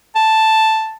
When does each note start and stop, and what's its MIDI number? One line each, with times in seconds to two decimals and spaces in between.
0.16 0.96 81